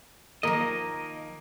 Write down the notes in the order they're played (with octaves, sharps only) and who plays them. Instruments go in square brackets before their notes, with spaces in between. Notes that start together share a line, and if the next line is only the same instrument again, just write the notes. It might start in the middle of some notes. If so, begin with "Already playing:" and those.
[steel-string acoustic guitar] D#3 F3 [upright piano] A#3 [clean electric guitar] A#4 D#5